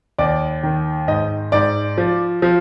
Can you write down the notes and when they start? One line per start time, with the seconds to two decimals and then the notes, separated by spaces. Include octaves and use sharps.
0.18 D#2 D5
0.63 D#3
1.08 G#2 D#5
1.52 G#2 D5
1.98 F3
2.42 F3